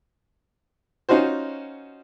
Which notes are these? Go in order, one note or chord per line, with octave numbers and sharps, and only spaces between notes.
C#4 D#4 F4 F#4 C5